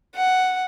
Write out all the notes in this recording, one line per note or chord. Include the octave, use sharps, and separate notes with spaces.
F#5